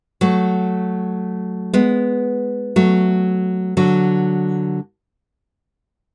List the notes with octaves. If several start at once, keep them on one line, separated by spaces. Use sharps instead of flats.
F#3 A3
G#3 B3
F#3 A3
D3 F#3